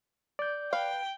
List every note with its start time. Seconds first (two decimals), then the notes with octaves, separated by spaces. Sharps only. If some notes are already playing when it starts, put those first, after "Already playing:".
0.39 D5 G6
0.73 B4 F5 G5